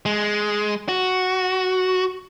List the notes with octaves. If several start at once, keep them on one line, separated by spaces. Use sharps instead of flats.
G#3
F#4